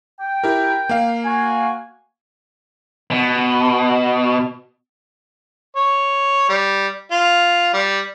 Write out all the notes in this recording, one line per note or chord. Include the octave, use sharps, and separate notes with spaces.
G5
E4 G4 A#4
A#3 F5
F#4 G#5
B2
C#5
G3
F4
G3